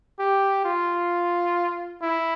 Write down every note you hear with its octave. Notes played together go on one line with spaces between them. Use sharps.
G4
F4
E4